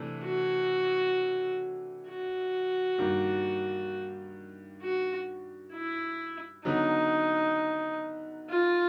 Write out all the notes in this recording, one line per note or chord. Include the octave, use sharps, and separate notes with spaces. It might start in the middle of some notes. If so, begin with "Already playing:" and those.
Already playing: C3 E3 A3 D4
F#4
F#4
G2 D#3 G3 A#3
F#4
E4
D3 F#3 B3 D#4
F4